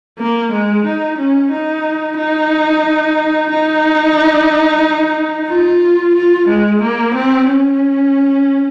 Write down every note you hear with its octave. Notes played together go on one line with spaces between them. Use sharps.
A#3
G#3
D#4
C#4
D#4
D#4
D#4
F4
F4
G#3
A#3
C4
C#4